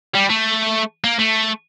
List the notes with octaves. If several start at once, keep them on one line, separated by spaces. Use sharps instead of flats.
G3
A3
A#3
A3